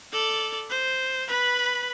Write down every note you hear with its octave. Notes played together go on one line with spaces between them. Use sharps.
A4 D5
C5
B4 B5